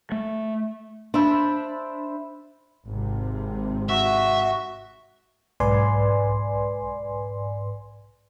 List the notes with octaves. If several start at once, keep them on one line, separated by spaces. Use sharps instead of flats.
A3
D4 C5 E5 B5
G#1 C3
F#4 E5
B1 G#2 B4 D5 G#5 C6